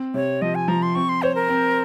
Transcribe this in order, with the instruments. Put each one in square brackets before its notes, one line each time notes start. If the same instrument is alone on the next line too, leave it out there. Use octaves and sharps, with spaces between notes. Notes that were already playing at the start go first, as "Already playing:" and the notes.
Already playing: [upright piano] C4
[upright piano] C3 [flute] C#5
[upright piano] F3 [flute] D#5
[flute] G#5
[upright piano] F3 [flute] A#5
[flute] C6
[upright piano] C4 [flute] C#6
[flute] C6
[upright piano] C5 [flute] C#5
[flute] A#4
[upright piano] C4